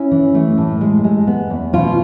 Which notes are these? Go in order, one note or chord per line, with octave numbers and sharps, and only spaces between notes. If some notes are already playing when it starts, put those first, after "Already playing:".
Already playing: C#4 E4
E3
A3
A2
G#3
G#3
B3
E2
B2 F4